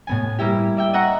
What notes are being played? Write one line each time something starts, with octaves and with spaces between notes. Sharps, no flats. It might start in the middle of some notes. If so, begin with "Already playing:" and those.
A2 B3 G#5
G3 A#3 E4 G4
D5 E5 G5
D#5 E5 F#5 A#5 C#6